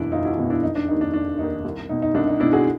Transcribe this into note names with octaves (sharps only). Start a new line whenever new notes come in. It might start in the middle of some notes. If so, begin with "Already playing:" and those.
Already playing: F#1 E2 B2 D4 E4
F#1 D#4 F4
E4 F#4
E2 B2
D4 E4
F1 D#4
D4
D#2 D#3 D#4
D4
F1 D4
D#2 D#3 D#4
C2
B2 D#4
D#4
C2 D4
D#4
B2 D4 E4
F#4 G#4